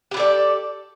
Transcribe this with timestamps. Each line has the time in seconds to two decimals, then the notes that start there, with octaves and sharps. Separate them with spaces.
0.11 G4
0.14 B4
0.17 A4
0.19 D5